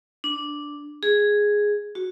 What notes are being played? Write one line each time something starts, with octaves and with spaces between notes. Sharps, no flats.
D4
G#4
F#4